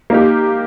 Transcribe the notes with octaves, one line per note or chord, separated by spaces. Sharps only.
A#3 D#4 G4